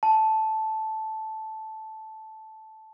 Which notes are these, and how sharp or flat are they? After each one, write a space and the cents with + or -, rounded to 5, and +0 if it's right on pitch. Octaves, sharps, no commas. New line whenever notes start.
A5 -10